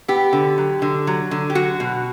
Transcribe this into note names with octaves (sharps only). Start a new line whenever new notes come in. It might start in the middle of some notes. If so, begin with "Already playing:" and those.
B3 G4
D3
F#3
D3
F#3
D3
G4
F#3 F#4
B2